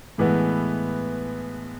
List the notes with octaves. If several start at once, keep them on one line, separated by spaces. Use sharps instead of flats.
A2 E3 G#3 B3